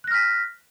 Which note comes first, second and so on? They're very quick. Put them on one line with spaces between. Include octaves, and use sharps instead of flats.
F#6 A#6 F6 B6